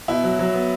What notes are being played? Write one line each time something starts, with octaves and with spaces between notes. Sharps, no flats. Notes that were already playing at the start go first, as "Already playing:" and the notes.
B2 E4
F#3
F#3
B3